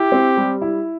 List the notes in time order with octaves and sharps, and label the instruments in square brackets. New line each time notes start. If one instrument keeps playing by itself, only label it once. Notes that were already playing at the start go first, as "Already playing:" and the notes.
Already playing: [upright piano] E4 [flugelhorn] G4
[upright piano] C4
G3
E4